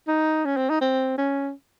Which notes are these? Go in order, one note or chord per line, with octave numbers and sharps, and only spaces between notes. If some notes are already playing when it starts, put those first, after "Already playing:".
D#4
C#4
C4
D#4
C4
C#4